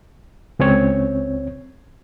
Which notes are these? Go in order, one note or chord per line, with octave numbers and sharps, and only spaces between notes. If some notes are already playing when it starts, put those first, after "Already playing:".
C#2 C4 C#5